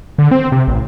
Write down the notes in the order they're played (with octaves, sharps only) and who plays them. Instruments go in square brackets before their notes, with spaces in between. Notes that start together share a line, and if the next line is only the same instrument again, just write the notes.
[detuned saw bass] D3
C4
C3
A1